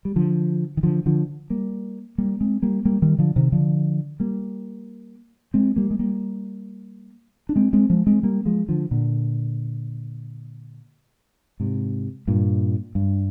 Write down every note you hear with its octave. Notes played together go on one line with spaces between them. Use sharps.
G3
D3 F3
D#3
D3 F3
D3 F3
G3 A#3
G3 A#3
G#3 C4
G3 A#3
G3 A#3
D#3 G3
D3 F3
C3 D#3
D3 F3
G3 A#3
G#3 C4
G3 A#3
G#3
G3 A#3
D4
G#3 C4
G#3 C4
F3 G#3
G#3 C4
G3 A#3
F3 G#3
D3 F3
A#2 D3
G#2 C3
G2 A#2
G2